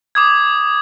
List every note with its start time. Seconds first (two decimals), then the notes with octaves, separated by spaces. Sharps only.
0.15 D6 D#6 G#6